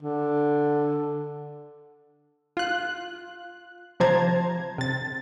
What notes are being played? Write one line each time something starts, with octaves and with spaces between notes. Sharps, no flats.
D3
F4 F#6
C3 F3 C5 A5 A#5 G#6
C3 A6